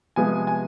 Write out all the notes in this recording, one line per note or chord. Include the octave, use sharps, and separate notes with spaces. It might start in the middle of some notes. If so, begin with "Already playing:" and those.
C3 F3 G#3 B3 G#5
G#5